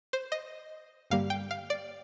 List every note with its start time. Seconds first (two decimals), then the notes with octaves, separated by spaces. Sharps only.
0.13 C5
0.32 D#5
1.10 G2 D3 G3 A#3 F5
1.30 G5
1.51 F5
1.70 D5